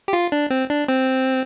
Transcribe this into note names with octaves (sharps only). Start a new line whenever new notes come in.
G4
F4
D4
C4
D4
C4